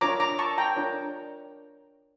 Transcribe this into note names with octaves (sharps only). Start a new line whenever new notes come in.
D4 F4 A#4 C#5 A#5 D6
A#5 D6
A5 C#6
G5 A#5
D4 F4 A#4 C#5